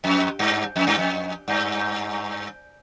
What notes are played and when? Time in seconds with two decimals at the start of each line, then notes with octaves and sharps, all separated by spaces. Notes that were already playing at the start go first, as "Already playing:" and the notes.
0.04 F2
0.39 G2
0.76 F2
0.87 G2
0.98 F2
1.48 G2